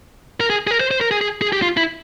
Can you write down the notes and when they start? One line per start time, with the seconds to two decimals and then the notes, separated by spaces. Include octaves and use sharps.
0.40 A#4
0.50 G#4
0.67 G#4
0.71 A#4
0.80 C5
0.91 C5
1.01 A#4
1.11 G#4
1.21 G#4
1.42 G#4
1.53 G4
1.62 F4
1.77 E4